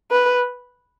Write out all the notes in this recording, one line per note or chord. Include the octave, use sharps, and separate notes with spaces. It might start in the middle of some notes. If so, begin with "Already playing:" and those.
B4